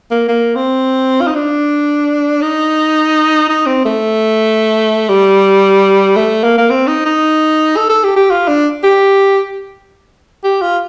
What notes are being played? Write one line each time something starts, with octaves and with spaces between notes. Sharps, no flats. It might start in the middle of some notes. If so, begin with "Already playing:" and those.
A#3
A#3
C4
F4
D#4
D4
D#4
D#4
C4
A3
G3
A3
A#3
A#3
C4
D#4
D#4
A4
A4
G4
G4
F4
D4
G4
G4
F4